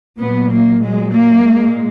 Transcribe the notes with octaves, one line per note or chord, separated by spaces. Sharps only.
A#2 F#3 B3
A#3
A#2 F#3 G#3
A#3
A#2 G#3